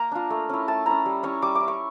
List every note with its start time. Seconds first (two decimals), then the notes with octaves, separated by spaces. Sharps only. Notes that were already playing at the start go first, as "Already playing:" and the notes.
Already playing: A#3 A#5
0.12 D4 F4
0.30 A3
0.49 C#4 E4
0.68 A3 A5
0.86 C#4 E4 A#5
1.06 G3
1.23 C#4 E4 C#6
1.42 G3 D6
1.55 D6
1.60 C#4 E4
1.68 C#6